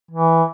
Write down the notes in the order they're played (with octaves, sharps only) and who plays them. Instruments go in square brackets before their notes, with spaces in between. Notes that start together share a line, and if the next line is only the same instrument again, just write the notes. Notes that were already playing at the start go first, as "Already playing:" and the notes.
[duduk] E3